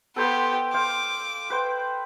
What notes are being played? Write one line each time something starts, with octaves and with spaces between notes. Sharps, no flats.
B3 G4 A4 C5 G5
C5 F5 D6
B4 C5 G5